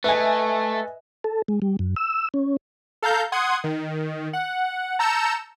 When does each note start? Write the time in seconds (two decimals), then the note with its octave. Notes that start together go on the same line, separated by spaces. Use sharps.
0.04 A3 B4 D#5 E5 G#5
1.24 A4
1.48 G#3
1.62 G3
1.79 F#2
1.96 E6
2.34 C#4
3.02 A4 F5 A#5 G6
3.32 F#5 C6 D#6 G#6
3.64 D#3
4.33 F#5
4.99 A5 A#5 E6 G6 C#7 E7